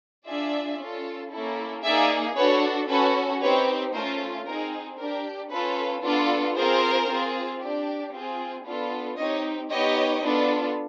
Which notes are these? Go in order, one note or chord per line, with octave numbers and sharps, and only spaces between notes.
D4 F4 G#4 D5 E5
C#4 F4 A4
A#3 C#4 E4 A4
A#3 D#4 G#4 D5 E5
D4 F#4 A4 B4 C#5
C#4 F#4 A4 B4
C4 D#4 G4 B4 C#5
A3 C#4 F4 A#4 C5
C4 D#4 G#4 A#4
D4 G4 A#4
C#4 F4 A4 B4
B3 D4 F4 A4
C4 F4 G#4 A#4 C5
C4 F4 G#4
D4 G4
C4 F4 G#4
B3 D4 F4 A4
C4 D#4 G4 C#5 D#5
B3 D#4 G4 C#5 D#5
B3 D4 F4 A4